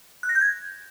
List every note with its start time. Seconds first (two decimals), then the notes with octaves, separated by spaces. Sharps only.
0.23 F#6
0.29 A#6
0.35 G6
0.41 G#6